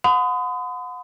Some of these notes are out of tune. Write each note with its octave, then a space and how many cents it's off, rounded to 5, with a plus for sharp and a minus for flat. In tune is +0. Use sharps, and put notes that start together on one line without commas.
F#5 -35 B5 +45 D#6 +0